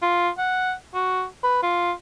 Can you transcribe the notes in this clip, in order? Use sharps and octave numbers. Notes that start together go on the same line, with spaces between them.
F4
F#5
F#4
B4
F4